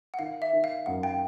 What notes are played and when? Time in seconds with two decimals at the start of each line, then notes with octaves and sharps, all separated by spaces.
0.14 F#5
0.19 D#3 F5
0.42 E5
0.53 D#3
0.64 F5
0.86 F#2 F#5
1.03 F5 G5